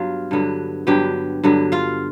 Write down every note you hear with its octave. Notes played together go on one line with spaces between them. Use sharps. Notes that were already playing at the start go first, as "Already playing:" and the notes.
Already playing: G2 F#3 B3 F4 F5
G2 D3 F#3 B3
G2 D3 F#3 B3 G4 G5
G2 D3 F#3 B3
F4 F5